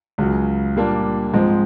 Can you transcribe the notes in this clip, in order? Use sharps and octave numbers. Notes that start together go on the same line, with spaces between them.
C#2 C#3 F#3
A#2 G3 A#3 D4
G#2 F3 G#3 C4